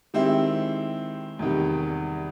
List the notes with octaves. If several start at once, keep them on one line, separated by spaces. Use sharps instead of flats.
D#3 G#3 C4 E4 G4
E2 C3 D#3 G3